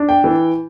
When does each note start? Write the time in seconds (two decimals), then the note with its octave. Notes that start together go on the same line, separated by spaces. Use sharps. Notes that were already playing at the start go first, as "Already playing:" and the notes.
Already playing: D4
0.09 G5
0.24 E3